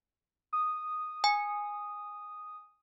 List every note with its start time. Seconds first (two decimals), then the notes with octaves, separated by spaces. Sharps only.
0.53 D#6
1.24 G#5